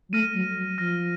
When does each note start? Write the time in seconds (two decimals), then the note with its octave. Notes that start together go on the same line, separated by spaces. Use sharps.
0.09 F#3
0.13 A3 F6 A#6 D#7
0.35 F#3
0.56 F#3
0.78 F3 F6 A#6 D#7